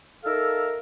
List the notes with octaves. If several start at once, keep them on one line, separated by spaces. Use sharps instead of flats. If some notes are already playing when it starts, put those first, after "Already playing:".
D#4 A4 A#4 E5 F5